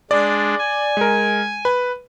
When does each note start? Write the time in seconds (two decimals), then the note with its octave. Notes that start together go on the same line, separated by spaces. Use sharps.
0.11 G#3 D4 D5
0.58 G#5
0.97 G#3 A#4
1.65 B4